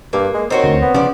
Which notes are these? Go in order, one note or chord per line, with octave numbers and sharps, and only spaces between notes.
G2 A#3
G#3
D#3 C4 F#4 C#5
D2
B3
C#3 F3 D5